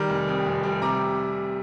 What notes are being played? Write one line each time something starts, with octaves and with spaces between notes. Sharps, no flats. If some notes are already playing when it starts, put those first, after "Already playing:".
Already playing: D#3 G3 A#5 D6
F1
F2
F1
G3
C3 A#5 D6